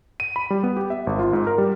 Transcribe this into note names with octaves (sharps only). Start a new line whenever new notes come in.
D#7
B5
G3
B3
G4
E5
G#1
F4
G#2
A#4
G3